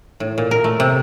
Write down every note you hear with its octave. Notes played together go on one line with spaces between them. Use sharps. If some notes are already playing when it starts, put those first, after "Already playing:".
A2
A#2
A#4
A3
C3